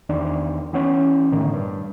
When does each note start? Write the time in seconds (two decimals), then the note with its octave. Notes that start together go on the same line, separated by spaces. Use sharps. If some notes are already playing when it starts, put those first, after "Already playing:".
0.09 E2 D#3 D4
0.73 E3 B3 C#4
1.32 A2 D3 D#3
1.54 G2